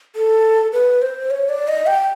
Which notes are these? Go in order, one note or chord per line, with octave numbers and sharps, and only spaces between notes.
A4
B4
C5
C#5
D5
D#5
G5